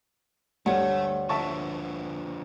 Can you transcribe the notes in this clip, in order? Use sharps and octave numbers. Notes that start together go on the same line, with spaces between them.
D2 G2 A3 G4 C#5 F#5
D3 F3 E5 A5 C#6